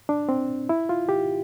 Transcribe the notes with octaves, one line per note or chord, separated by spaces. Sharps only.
D4
C4
E4
F4
G4